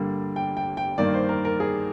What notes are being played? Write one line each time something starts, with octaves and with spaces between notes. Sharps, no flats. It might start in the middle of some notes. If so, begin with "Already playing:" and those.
Already playing: G2 D3 G3 A#3
G5
G5
G5
G2 D#3 A#3 D5
C5
A#4
A#4
G#4